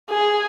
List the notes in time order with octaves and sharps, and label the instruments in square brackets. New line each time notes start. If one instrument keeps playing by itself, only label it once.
[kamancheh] G#4